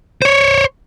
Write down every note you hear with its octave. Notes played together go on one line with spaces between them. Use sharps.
C5 C#5